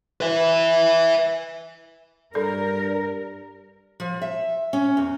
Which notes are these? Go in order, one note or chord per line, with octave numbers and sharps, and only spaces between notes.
B4 E5
G2 A4 A#4 D5
F3
E5
C#4
E2